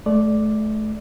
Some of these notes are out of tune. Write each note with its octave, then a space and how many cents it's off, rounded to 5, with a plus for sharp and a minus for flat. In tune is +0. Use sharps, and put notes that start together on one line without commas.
A3 -30 D5 +0